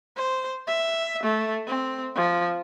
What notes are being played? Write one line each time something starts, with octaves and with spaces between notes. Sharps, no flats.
C5
E5
A3
C4
F3